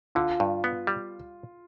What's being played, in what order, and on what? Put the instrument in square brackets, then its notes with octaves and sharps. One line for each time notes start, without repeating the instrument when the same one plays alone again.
[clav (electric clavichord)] D3 [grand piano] F4
[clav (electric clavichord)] G2
B3
G3